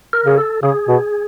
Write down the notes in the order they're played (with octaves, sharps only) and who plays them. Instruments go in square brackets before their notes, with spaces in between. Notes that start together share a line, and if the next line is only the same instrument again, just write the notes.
[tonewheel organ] A#4
[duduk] C#3 [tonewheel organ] G#4
[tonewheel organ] A4
[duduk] C#3 [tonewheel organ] G#4
[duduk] B2